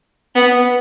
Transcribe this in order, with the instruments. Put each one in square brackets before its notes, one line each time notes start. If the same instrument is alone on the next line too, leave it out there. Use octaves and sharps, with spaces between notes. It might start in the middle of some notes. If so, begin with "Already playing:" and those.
[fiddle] B3